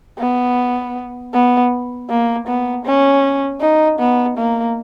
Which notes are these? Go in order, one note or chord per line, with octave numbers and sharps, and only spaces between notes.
B3
B3
A#3
B3
C#4
D#4
B3
A#3